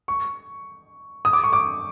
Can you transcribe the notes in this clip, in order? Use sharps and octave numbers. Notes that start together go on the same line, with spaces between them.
C#6
D#6
D6
C#6
D6